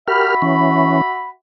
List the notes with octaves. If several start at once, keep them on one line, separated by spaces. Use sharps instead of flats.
F#4 G4 A#4 E5 B5 F6
E3 C#4